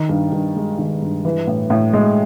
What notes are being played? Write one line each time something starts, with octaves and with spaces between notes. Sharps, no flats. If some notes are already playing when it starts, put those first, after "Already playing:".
Already playing: D#3
G2
G2
G#3
D#3
G2
E3
A2
A2
G#3